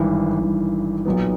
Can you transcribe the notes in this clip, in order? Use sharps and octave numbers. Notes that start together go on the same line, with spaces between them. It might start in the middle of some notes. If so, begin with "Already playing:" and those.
Already playing: G#1 G2 E3
G#1 G2 E3
B1 A#2 F#3 B3